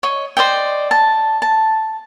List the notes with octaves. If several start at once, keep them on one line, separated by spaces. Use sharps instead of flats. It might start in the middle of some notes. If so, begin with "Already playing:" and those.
C#5 D#5
C5 D5 D#5 G5
A5
A5